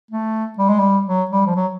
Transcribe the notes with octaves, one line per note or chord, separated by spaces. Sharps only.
A3
G3
G#3
G3
F#3
G3
F3
F#3